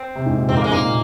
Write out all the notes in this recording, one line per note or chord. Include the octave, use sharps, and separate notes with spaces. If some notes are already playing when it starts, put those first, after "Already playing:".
Already playing: C4
C3
G#2
A#2
G#2 C4
A#3
A#2
G#3
G#2 A#3
A#2